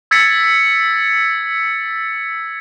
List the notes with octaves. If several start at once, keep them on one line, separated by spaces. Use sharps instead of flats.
E6 G#6 A6 B6 C#7